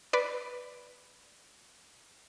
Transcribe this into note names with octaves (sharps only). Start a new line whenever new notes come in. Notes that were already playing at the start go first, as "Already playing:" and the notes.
B4 D5